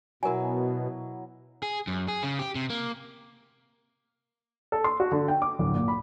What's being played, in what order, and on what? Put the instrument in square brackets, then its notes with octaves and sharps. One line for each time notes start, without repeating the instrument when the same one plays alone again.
[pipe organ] B2 [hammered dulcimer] F#3 E4 [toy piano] A#4 G#5
[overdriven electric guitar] G#4
F#2
G#4
C#3
G4
C3
A#3
[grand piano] A4
C6
F#4
D3
G5
D6
D1
A#2
B5